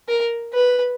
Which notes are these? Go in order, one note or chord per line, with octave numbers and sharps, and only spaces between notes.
A#4
B4